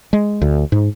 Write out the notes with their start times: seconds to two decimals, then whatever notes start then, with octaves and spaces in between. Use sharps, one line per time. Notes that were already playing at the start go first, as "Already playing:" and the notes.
0.13 G#3
0.42 D2
0.72 G#2